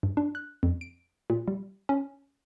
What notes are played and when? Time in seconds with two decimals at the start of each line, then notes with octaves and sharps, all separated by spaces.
0.03 G2
0.17 D4
0.35 F#6
0.63 F2
0.81 D7
1.30 A#2
1.48 G3
1.89 C#4